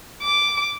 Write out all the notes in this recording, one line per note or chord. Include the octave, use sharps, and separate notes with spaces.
D6